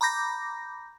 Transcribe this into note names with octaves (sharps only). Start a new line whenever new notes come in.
A#5 B5 D6 G6 A#6